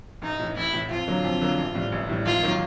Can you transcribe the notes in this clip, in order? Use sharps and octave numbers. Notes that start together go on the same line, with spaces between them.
A1 D#4
A2 E3
A1 E4
A2 E3
F2 F4
D3 F#3 A#3
F2
D3 F#3 A#3
A1
A2 E3 G3
A1
A2 E3 G3
G#1 F4
D#3 F#3 A#3